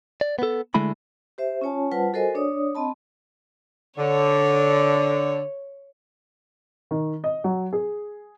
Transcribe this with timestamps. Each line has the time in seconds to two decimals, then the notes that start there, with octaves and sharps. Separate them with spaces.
0.21 D5
0.39 B3 A4
0.74 D3 G#3 A3 E4 B5
1.38 G4 C5 E5
1.61 C#4 F4 C#5 G#5 A5
1.92 G3 F4 B4 C5 F#5 A5
2.13 F#4 A4 A#4 C5 D#5 G#5
2.35 D4 C#5 D5 D#6
2.75 C4 D#5 A5 B5
3.98 D3 C#5
6.91 D#3
7.24 D#5
7.44 F#3
7.73 G#4